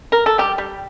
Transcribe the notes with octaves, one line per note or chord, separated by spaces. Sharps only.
A#4
A4
G3 G4
G3